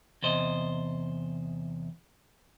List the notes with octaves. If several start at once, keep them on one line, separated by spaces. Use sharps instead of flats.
E2 C3 C5 D#5